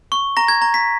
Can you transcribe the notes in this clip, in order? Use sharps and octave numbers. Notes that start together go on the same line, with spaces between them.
C#6
A#5 A#6
G#6
A#5
B6